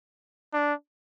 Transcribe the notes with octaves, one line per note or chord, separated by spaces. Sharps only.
D4